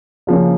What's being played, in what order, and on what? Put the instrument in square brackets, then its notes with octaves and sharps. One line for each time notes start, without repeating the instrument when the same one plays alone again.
[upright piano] C#3 F3 A#3 C#4